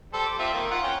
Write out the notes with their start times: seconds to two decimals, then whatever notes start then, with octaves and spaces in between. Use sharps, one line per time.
0.13 G3 A4 C5
0.26 D6
0.39 C4 F4 E5
0.54 D#3 A#3
0.71 F4 F#5 A#5
0.83 C#4 G5